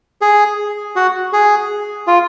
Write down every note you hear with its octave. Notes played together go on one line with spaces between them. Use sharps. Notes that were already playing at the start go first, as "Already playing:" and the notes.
G#4
F#4
G#4
F4